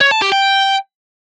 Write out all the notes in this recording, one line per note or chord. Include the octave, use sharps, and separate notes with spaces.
C#5
A5
G4
G5